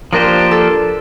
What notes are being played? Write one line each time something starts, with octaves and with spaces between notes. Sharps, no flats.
F3 A#3 D4 G4 A#4 C5
A4